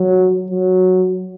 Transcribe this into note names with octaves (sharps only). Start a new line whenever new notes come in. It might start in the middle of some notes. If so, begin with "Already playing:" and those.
Already playing: F#3
F#3